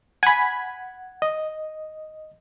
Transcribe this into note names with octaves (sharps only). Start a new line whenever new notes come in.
F#5 G#5 B5 G#6
D#5